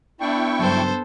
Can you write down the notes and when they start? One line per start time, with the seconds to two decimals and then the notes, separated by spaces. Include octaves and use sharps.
0.21 B3 D4 E4 G5 C#6
0.59 G2 C#3 F#3 A4 C5